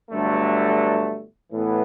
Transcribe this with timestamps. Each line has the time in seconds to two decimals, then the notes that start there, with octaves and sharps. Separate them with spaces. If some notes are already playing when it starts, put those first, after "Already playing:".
0.11 G1 G2 D3 F#3 A3
1.52 A2 E3 B3